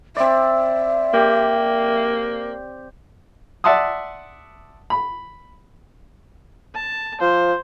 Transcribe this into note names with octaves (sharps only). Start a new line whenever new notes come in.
C4 D5 E5
A#3 G4
D5 E5 F#5 A5 C6 D#6
B5
A5
F3 C5